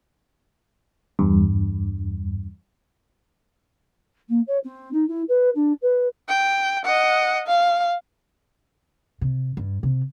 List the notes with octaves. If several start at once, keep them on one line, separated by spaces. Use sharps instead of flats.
E2 G2
A#3
C#5
C4
D#4
E4
B4
D4
B4
G5
D#5 F#5
F5
C3
G2
C3